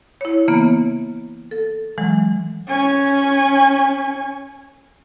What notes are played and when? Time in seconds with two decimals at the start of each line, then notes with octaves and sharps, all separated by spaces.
0.21 E4 C#5
0.48 C#3 E3 A#3 B3
1.51 A4
1.98 E3 F#3 G#3
2.67 C#4 G#5